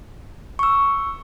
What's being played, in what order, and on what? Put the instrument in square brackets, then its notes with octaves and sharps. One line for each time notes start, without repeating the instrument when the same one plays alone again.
[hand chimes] C#6 E6